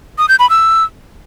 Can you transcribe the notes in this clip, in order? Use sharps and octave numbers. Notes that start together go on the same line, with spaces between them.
D#6
G6
B5
E6